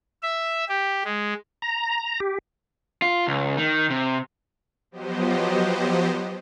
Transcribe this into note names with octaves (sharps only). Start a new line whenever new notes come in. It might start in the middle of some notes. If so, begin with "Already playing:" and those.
E5
G4
G#3
A#5
G4
F4
C#2
D#3
C3
F3 F#3 B3 G4 C5 D#5